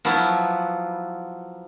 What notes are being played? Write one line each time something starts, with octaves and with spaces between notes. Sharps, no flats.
F3 F#3 B3 E4 F4 B4